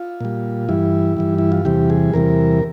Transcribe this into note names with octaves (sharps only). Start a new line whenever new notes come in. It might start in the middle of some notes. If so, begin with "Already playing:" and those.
Already playing: F4
A#2 G3
G2 E3 G3 E4
G2 E3 G3
E4
F4
E2 C3 E3 G3 G4
G#4
E2 C3 E3 G3 A#4